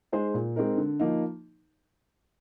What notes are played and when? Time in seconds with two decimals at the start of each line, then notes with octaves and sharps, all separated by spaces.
0.12 G#3 D#4 G#4 C5
0.34 A#2
0.56 G#3 C4 D#4 A#4
0.78 D3
1.00 F3 A#3 D#4